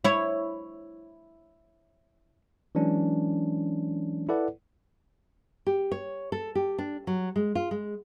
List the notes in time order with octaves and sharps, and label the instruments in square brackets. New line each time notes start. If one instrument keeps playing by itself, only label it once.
[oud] E4 C#5
[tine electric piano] E3 F#3 G#3 C#4 D4
E4 A4 B4 D5 F#5
[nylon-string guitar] G4
C#5
A4
G4
D4
F#3
G#3
F4
G#3